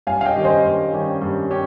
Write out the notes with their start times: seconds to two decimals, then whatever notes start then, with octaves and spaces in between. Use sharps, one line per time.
0.07 G2 F5 G#5
0.21 F5
0.26 D#5 G5
0.36 D#3 G3 C#4 G4
0.45 C5 D#5
0.64 G2
0.92 D#3 G3 C#4 G4
1.22 G2
1.51 C#4 G4